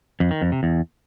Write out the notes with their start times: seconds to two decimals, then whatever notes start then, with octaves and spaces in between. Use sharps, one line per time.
0.20 F2
0.31 D#3
0.42 F2
0.52 C3
0.63 E2